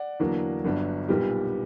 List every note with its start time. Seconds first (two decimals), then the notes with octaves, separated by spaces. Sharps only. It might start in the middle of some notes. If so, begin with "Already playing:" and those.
Already playing: D5 F#5
0.20 E2 D3 F#3 A#3 D4
0.64 G1 G2 F#3 B3 D4
1.08 B1 A#2 G3 B3 G4